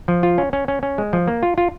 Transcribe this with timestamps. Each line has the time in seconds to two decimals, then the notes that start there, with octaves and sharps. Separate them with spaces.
0.08 F3
0.23 F4
0.38 C#4
0.53 C#4
0.68 C#4
0.83 C#4
0.98 G#3
1.13 F3
1.28 A#3
1.43 F4
1.58 F4